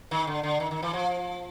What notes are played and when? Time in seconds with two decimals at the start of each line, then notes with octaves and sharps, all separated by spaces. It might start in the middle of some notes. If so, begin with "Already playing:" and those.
0.11 D#3
0.27 D3
0.43 D3
0.60 D#3
0.71 D#3
0.82 E3
0.93 F3